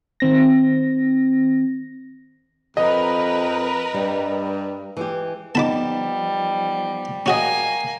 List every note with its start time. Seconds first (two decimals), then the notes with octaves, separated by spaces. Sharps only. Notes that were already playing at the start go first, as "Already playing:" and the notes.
0.20 D#3 C4 A#6
2.77 F2 A#4 B4 D#5
3.94 G2 G3
4.97 E3 G#3 G4
5.55 F3 G3 B3 D#4 A5 B5 D6
7.26 A#3 C#4 F#4 D#5 G#5